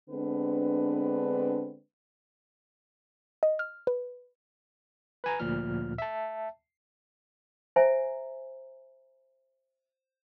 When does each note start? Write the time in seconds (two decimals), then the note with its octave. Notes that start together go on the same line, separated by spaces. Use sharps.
0.10 D3 G#3 B3 C4 D4 B4
3.43 D#5
3.59 F6
3.87 B4
5.24 B4 G#5 A#5
5.40 D2 A#2 F3 F6
5.98 E5 A5
7.76 C5 E5 G#5 A#5